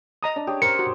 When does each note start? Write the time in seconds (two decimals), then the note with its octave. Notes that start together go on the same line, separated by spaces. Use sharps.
0.23 D#5 A#5 D#6
0.36 D4
0.47 G4 G#4 C#5
0.62 A#4 C5 C#7
0.79 F#4